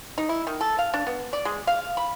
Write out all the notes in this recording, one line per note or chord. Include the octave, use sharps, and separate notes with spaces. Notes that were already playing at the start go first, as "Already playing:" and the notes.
D#4
E4
D#3
A4
F5
D4
B3
D5
G#3
F5
B5